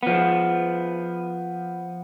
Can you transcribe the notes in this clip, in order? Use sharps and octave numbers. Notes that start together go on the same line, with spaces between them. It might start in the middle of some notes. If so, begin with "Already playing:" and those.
F3 B3